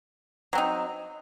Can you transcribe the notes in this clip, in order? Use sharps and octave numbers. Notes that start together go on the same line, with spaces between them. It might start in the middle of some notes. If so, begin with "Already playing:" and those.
F#3 C4 D#4